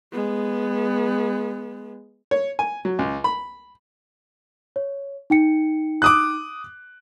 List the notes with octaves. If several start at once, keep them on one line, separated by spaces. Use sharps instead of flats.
G#3 B3
C#5
G#5
F#3
C#2
B5
C#5
D#4 G5 C#7
D6 D#6 F#6